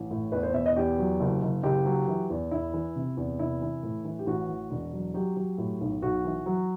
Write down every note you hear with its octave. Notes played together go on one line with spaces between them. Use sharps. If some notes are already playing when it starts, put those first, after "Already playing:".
Already playing: A1
A2
E2 B4
C5
B2 E5
D#5
E2 G4
F#3
F#1
F#1
F#1 G4
F#3
E3
E2
E2 E4
E3
C3
E2
C3 E4
E3
A2
E3
G4
A1 F#4
E3
E1
F#3
F#3 G4
F#3
A2
B1
B1 F#4
E3
F#3